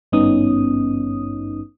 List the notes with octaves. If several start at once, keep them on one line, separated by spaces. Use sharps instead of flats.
G#1 G2 B3 C#4 D#4 D#6